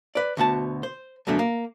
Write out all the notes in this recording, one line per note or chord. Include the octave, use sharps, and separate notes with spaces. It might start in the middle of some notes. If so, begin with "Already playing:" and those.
B4 D5
D2 B2 F#5 A5
C5
F#2 B2 D3 A3
A#3